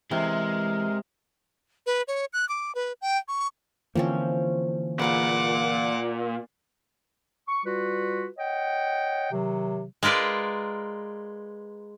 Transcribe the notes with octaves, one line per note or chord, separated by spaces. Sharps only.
C3 E3 G#3 A#4
B4
C#5
F#6
D6
B4
G5
C#6
D3 E3 F3 A#3 C4 C#4
A#2 G#4 A#4 B4 F#5 D6
C#6
G3 F4 F#4 B4
C#5 D#5 F#5 G5
C3 D#3 F#3
G#3 F4 A#4 B4 D5